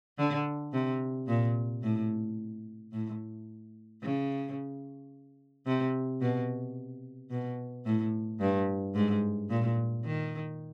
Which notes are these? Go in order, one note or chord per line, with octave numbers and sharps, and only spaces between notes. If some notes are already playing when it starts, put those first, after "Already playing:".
D3
C3
A#2
A2
A2
C#3
C3
B2
B2
A2
G2
G#2
A#2
D#3